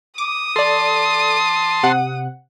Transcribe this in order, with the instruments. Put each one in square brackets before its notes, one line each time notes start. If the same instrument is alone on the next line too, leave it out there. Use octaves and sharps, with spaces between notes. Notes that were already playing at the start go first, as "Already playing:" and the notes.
[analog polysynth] D6 [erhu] D#6
[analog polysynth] A4 D5 [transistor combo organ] A5 C6
[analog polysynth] C3 F#5